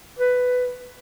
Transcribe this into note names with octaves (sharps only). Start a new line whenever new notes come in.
B4